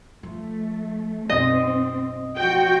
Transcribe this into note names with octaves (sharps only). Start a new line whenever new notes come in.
F3 A3
B1 F#2 C4 D#5
F3 F#4 G5